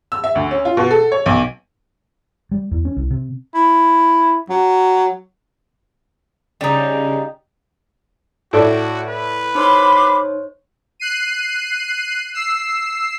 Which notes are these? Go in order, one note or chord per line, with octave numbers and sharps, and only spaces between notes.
E6
E5
D2
C#4
F4
B2
A4
C#5
B1
G3
E2
C#4
C2
C3
E4
F#3
C#3 G3 D#4
A2 F#4 A4 D5
B4
D#4 C5 C#5 B5 C6 D6
F#6 C7 D#7
E6 C7